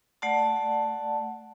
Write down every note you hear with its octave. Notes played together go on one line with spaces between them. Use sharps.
A3 D5 F#5 A5